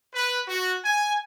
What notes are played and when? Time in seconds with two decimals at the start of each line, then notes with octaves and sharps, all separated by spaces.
0.14 B4
0.47 F#4
0.84 G#5